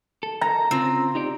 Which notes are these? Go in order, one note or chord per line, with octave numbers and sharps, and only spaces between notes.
A4
A#5
C#3 C4 F4
D#4 G4 D5